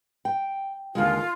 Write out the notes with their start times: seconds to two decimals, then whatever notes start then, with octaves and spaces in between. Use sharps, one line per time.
0.25 G5
0.95 D#2 D3 G#3 F4